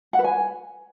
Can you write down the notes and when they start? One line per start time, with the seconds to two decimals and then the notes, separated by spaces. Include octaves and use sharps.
0.13 F#5
0.19 B4
0.24 G#5